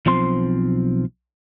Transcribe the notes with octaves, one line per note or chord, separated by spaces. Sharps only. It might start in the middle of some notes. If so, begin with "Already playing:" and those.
B1 F3 C4 C6